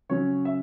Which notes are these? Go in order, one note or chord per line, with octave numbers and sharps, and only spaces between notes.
C#3 F#3 C#4 C#5
E5